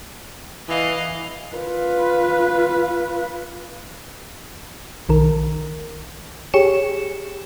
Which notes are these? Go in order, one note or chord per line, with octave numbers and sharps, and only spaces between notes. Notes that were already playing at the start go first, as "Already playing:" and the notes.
E3 D#5 F5
F4 B4
B1 D#3 A#4
G4 G#4 C#5 C#7 E7